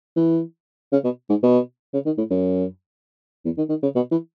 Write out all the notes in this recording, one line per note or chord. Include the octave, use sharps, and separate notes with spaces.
E3
C#3
B2
G#2
B2
C#3
D#3
A2
F#2
E2
D#3
D#3
C#3
B2
E3